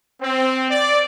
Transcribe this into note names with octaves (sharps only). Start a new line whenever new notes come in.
C4
D5